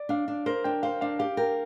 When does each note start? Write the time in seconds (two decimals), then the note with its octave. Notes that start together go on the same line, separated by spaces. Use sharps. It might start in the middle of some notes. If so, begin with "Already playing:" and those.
Already playing: D5
0.09 D4 F5
0.28 D4
0.46 A#4 C5
0.64 D4 G5
0.83 C5 F5
1.01 D4 F5
1.19 G4 F5
1.37 A#4 G5